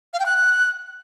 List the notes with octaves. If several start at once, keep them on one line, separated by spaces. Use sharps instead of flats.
F5
G5
F#6